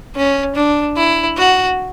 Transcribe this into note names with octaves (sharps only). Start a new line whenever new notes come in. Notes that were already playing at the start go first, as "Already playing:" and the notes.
C#4
D4
E4
F#4